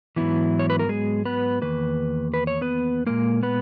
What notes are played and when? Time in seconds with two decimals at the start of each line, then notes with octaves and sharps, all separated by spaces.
0.16 G#2 E3 F#3 B3 E4
0.59 C#5
0.70 B4
0.79 A#4
0.89 G#3 G#4
1.25 B3 B4
1.62 E2 D#3 A#3 B4
2.34 B4
2.47 C#5
2.61 B3 B4
3.06 A#2 G#3 A#3 A#4
3.43 B3 B4